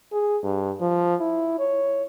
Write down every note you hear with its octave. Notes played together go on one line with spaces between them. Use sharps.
G#4
G2
F3
E4
C#5